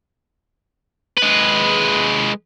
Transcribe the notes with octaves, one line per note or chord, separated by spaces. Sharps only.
G#3 B4